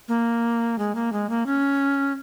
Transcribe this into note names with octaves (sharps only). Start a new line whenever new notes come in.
A#3
G#3
A#3
G#3
A#3
C#4